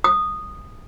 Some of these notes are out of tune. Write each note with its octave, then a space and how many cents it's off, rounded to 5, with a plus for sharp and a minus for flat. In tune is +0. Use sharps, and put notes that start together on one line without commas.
D#6 -10